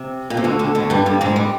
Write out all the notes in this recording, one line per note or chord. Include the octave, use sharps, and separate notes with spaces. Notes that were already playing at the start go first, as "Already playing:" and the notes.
Already playing: C3
A#2
C3
D2 D3
D2 D3
D2 D3
G2 G3
G2 G3
G#2 G#3
G3